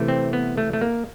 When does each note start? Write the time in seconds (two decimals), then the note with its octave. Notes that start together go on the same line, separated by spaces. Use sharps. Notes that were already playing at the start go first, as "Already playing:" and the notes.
Already playing: C3 E3 A3
0.08 C4
0.33 B3
0.57 A3
0.73 A3
0.81 A#3